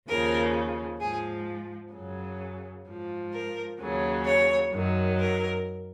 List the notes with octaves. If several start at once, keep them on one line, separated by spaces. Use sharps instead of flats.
D#2 C#3 F3 A#4
G#2 F3 G#4
F#2 C#3 F#3
G#2 F3
A#4
D#2 C#3 F#3
C#5
F#2 D#3 F#3
A#4